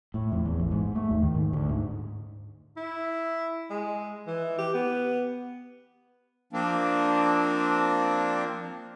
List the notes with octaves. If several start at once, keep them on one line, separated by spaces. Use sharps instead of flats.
A2
F2
E2
A1
G#2
A3
D#2
D#3
G#2
D2
G#2
E4
G#3
E3
G4
B3
F3 A#3 C4 D4